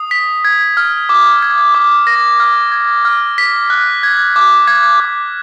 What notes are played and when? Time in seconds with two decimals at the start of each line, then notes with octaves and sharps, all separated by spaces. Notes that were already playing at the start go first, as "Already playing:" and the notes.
Already playing: D#6
0.11 B6
0.45 G#6
0.77 F6
1.09 D6
1.42 G#6
1.75 D6
2.07 A#6
2.40 F6
2.72 G#6
3.05 F6
3.38 B6
3.70 F#6
4.03 G#6
4.36 D6
4.67 G#6
5.00 D6